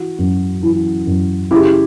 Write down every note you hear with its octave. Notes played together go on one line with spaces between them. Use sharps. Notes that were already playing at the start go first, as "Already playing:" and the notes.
Already playing: E3 F#4
F#2
E3
F#2
C#3 E4 G4